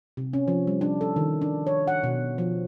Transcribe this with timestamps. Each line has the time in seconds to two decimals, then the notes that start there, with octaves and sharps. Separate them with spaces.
0.17 C3
0.33 C#4
0.48 F3
0.67 G3
0.81 D4
1.01 A4
1.16 D#3
1.41 D4
1.67 C#5
1.88 F#5
2.03 B2
2.38 F3